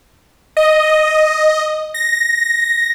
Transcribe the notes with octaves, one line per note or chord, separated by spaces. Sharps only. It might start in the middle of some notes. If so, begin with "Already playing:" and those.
D#5
A#6